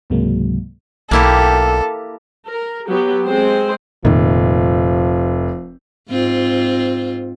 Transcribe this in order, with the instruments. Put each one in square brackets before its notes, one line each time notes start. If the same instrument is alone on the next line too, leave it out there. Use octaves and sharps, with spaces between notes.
[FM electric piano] C#2 G#2 C3 F#3 G#3 A#3
[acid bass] B1 [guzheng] A#3 E4 G4 [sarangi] A4
[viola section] A#4
F#3 B3 G4
G#3 C4 C5
[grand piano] F1 [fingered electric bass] A#2 D#3 [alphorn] F3
[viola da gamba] G#2 C4 F4